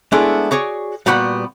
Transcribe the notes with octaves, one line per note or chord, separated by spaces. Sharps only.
G#3 A3 B3 D4 E4
F#4 G#4 C#5 D5
A#2 G3 B3 F#4 F#5 B5